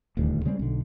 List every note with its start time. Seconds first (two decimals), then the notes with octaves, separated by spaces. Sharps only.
0.17 D#1 A1 D2 G2
0.45 C#3 G3 G#3 C4
0.59 B1 D3